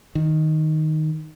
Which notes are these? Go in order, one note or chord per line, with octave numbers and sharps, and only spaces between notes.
D#3